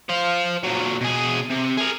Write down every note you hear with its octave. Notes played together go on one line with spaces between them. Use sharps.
C5 F5
A#2 F#3
B2 G#4
C3
G#4 A#4